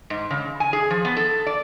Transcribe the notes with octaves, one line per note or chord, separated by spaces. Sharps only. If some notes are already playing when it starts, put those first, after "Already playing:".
G#2
C#3
G#5
G#4
F3
B3
A4
D5